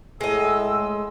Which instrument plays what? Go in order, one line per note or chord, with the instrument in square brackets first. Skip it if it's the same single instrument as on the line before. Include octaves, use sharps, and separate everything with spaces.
[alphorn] A2 [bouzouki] G#3 D#5 [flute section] E6